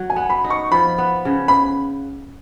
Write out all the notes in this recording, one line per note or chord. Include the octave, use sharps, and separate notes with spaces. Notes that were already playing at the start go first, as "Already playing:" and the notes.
Already playing: F#3
G#5
B3
B5
D#4
C#6
F3 B5
B3
C#3
B5